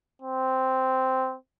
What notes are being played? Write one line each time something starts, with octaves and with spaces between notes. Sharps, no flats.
C4